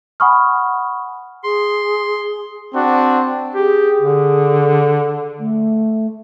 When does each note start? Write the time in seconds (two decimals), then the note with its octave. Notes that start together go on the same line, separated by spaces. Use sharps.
0.20 F#5 G#5 B5 C#6 D#6 F6
1.44 G#4 C6
2.74 C4 D4 F#4
3.55 G4 G#4
4.02 D3
5.39 A3